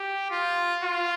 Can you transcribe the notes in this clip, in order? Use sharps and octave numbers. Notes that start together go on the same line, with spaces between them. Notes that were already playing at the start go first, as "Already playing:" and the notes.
Already playing: G4
F4
F4